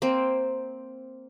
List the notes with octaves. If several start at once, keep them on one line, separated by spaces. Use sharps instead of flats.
A#3 C4